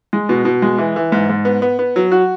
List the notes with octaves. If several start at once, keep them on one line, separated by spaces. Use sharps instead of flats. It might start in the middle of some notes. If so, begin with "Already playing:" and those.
G#3
B2
B2
G#3
E3
E3
G#2
G#2
B3
B3
B3
F#3
F#4